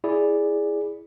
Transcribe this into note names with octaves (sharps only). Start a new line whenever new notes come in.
E4 G#4 D5